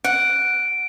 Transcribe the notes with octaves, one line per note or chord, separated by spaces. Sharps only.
F#5 D7